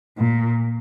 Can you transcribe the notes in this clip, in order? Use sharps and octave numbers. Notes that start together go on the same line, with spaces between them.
A#2